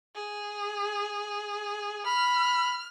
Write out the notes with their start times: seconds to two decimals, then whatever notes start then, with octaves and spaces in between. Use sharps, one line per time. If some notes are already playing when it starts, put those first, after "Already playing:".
0.15 G#4
2.06 B5 F6